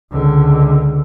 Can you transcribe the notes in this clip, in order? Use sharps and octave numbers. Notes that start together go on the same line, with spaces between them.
C#2 D3